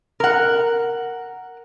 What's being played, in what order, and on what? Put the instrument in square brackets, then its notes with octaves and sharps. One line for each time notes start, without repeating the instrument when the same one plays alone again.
[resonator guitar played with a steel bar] A#4 F#5